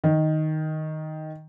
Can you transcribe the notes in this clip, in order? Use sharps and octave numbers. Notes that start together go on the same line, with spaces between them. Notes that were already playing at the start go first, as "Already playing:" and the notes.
D#3